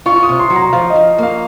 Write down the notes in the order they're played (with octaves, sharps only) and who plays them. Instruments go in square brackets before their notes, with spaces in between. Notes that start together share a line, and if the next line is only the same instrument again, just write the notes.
[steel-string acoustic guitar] F4 [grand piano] C#6
[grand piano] C#6
D#6
[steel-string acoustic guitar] C3
[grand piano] C6
[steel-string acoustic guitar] F#3
[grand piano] A#5
[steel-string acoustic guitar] F3 [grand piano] F5
[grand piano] D#5
[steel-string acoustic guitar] F3
[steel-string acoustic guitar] A#3 [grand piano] F5